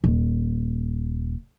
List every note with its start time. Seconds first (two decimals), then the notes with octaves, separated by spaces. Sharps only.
0.04 D#1